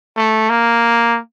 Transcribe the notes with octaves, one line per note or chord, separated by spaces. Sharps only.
A3
A#3